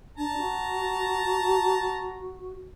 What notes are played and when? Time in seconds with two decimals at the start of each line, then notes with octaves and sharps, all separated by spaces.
0.17 D4 A5 A#5
0.37 F#4